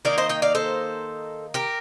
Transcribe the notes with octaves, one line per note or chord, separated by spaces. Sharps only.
D#3 A#3 D#4 A#4 D5
C5 D#5
D#5 G5
D5 F5
A4 C5
G4 A#4